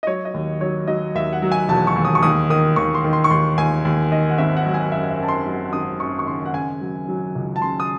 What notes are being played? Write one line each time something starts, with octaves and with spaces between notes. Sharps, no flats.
D#5
F#3 C#5
D#5
D#2
F#3 C#5
F#3 D#5
D#2 E5
F#5
F#3
G#5
E1 A5
C#6
D#2
D#6
C#6
D#2 D#6
D#3 D#6
D#2 C#6
C6
D#3
C6
C#6
D#2 C6
D#2 G#5
D#2
D#3 D#5
F#5
G#1 E5
F#5
F#3
G#5
F#2 E5
E5
F#2 A5
C6
F#3
G#1 D#6
F#2 C#6
C#6
C#3 C6
F#5
C#3 G#5
F#3
F#3
C#2
A5
C#3 C6
D#6